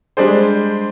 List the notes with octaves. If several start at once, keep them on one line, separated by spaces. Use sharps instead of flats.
G3 G#3 D4 G#4 C5